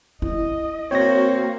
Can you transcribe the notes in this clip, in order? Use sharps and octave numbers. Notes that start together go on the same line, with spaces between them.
E4 D#5
A#3 C4 F#4 C#5 A#6